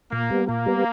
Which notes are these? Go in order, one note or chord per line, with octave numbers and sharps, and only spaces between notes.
A#2 A#3
G3 B3
A#2 A#3
G3 B3